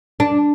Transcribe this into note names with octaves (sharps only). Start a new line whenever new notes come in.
D4